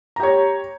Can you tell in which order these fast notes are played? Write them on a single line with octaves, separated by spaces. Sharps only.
A#5 G4 C#5